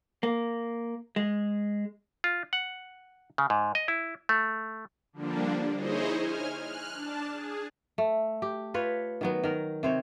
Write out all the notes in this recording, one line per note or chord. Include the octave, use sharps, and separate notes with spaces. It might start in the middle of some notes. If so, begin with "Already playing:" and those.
A#3
G#3
F4
F#5
C#3
G#2
D#5
E4
A3
D3 F3 G3 A#3 D4
D#4 E4 G#4 C5 C#5 D#5
G#5 F6
F6 F#6
D4 A5
G#4
A3
G4
F4 B4 C#5
D#3 F#3 B3
D#3 A#4
C3 C5 C#5